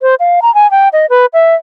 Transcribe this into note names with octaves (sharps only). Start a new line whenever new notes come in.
C5
F5
A#5
G#5
G5
D#5
B4
E5